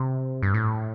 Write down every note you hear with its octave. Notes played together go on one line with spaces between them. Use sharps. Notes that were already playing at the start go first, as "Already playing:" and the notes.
Already playing: C3
G2
A2